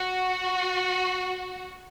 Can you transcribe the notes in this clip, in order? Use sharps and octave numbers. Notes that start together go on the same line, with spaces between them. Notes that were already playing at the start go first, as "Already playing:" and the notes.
Already playing: F#4